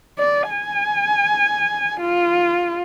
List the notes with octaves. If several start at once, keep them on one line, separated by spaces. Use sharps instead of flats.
D5
G#5
F4